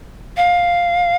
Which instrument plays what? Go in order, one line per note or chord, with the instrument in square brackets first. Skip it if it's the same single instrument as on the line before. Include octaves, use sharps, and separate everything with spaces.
[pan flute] F5